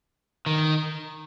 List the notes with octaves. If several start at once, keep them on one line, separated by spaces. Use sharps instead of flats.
D#3